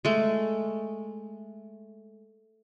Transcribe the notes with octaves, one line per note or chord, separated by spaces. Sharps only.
G#3 A3